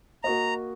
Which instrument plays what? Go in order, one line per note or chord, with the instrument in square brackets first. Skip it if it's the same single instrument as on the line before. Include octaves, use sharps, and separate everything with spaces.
[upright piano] A#3 F#4 D#5 [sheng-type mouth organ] A#5